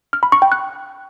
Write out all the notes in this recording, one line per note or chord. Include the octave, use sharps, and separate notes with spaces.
F6
B5
C#6
G5
F#6